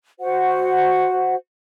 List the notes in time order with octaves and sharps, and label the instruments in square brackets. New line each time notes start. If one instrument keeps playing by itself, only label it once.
[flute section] F#4 C5 F#5